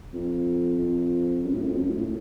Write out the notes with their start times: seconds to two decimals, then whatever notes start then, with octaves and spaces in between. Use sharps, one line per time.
0.13 F2
0.79 F2
1.44 F#2
1.53 A2
1.61 F#2
1.69 F2
1.78 F#2
1.89 A2
2.00 A2